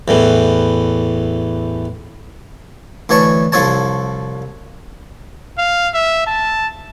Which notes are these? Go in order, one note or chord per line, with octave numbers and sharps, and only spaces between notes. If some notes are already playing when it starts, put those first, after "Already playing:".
E2 A2 E3
D2 E3 C#5 A5 C#6
C2 F3 A4 C#5 A5
F5
E5
A5